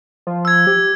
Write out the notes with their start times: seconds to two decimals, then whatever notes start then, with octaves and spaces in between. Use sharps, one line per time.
0.27 F3
0.45 E6 G#6
0.67 G4